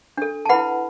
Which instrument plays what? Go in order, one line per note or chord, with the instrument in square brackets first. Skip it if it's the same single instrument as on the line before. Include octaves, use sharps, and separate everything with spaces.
[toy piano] D4 A4
A5
E4 B4 F#5 B5